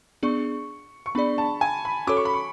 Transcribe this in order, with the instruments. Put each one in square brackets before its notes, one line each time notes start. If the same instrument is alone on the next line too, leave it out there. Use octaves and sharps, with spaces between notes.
[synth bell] B3 D4 G#4 D5 [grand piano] C#6
[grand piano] C#6
[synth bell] B3 D4 G#4 D5 [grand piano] B5
[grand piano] A5
G#5
B5
[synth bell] C#4 F#4 A4 C#5 [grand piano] D6
[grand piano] C#6
B5
C#6